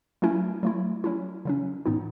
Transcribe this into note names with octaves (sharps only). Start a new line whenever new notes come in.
F#3 A3 C#4 E4
F#3 A3 E4
F#3 C#4 E4
C#3 F#3 C#4
A2 E3 B3 D#4